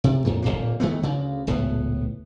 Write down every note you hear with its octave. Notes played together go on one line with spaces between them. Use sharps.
C3
F2 A#2 D#3
D1 F2 A#2 A#3
D#3 G#3 A3 B3
D2 C#3
D#1 C#2 A2 B3